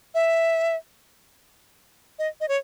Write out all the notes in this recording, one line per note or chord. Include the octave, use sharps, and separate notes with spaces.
E5
D#5
D#5
C#5